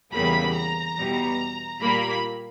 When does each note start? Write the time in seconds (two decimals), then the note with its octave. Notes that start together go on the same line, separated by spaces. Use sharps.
0.12 E2 C#3 E3 G3 A#3 B5
0.55 A#5
0.96 E2 B2 G3
1.80 A#2 G3 A#3 B5